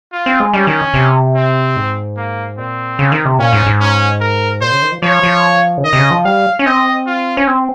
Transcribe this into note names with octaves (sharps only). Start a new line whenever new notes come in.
F4
C4
G#3
G3 C#4
D#3
C3
C4
G#2
A#3
A#2 C4
C#3
D#3
C3
A#2 C#4
G#2
G#2
C#4
A#4
A#2 C5
C#3
D#3
F3
F3 C#5
F3
C#3
D#3 D#5
C3
C#3
F3
G3 F5
C#4
C4 D#5
F4
C#4
C4